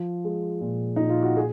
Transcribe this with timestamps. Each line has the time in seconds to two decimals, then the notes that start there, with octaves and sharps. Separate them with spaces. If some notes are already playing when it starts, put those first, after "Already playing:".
Already playing: F3
0.24 G#3
0.61 A#2
0.96 A#2 D#4
1.10 F4
1.23 F#4
1.37 A#2 G#4